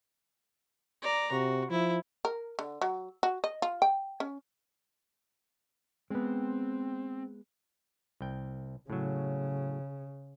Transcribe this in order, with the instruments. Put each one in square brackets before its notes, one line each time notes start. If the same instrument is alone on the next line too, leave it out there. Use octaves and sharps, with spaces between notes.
[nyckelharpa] D5 A#5
[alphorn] C3 [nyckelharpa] F#4
[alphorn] F3 [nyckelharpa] E4
[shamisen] A#4
D3
F#3
F#4
D#5
F4
G5
C#4
[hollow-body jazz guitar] G#3 B3 [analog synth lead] C4
[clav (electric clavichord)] C2 G5
[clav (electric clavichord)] A2 F#3 [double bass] C#3